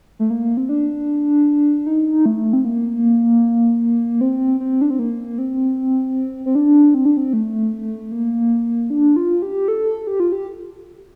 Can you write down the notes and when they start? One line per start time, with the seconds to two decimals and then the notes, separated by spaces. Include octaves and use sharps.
0.19 A3
0.30 A#3
0.57 C4
0.69 D4
1.86 D#4
2.26 A3
2.53 C4
2.65 A#3
4.21 C4
4.60 C4
4.81 D4
4.90 C4
4.99 A#3
5.38 C4
6.46 C4
6.55 D4
6.94 C4
7.06 D4
7.17 C4
7.33 A3
8.12 A#3
8.90 D4
9.16 F4
9.42 G4
9.68 A4
10.07 G4
10.20 F4
10.32 G4